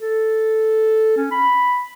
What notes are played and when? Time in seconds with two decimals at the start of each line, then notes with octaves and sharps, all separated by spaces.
0.01 A4
1.17 C#4
1.32 B5